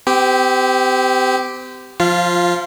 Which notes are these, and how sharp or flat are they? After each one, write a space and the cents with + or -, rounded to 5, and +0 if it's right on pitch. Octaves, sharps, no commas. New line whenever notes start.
C4 -40 G4 +0
F3 +10 F4 +0 F5 -30